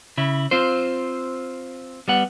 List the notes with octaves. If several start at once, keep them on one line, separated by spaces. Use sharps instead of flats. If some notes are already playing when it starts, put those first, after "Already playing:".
C#3 E4
C4 F4 C5
G3 B3 F#5